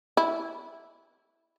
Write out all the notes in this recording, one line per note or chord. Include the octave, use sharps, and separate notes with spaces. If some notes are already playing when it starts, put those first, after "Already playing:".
E4